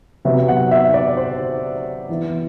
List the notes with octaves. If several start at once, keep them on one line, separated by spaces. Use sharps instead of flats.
C3 F#3 B3 E5
F#5
E5
D5
C5
E3 B3 E4